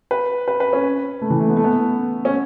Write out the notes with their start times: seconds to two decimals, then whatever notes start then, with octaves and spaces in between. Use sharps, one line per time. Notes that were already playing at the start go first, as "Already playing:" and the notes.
0.11 B4
0.48 B4
0.60 B4
0.73 C#4
1.21 A3
1.30 E3
1.40 A3
1.49 B3
1.57 A3
1.64 B3
2.25 C#4